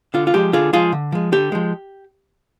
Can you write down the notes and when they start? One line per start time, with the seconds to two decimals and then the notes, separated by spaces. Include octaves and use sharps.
0.14 D3 F4
0.27 F4
0.34 F3 G#3 G4
0.53 D3 F4 G#4
0.73 F3 G#3 F4 G#4
0.92 D3
1.12 F3 G#3
1.32 D3 G4
1.52 F3 G#3